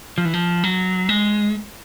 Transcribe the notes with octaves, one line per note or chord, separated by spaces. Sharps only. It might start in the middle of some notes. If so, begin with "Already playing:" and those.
F3
E3
F3
F#3
G#3